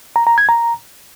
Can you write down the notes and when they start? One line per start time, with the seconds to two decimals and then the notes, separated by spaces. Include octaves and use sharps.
0.16 A#5
0.27 A#5
0.38 G#6
0.49 A#5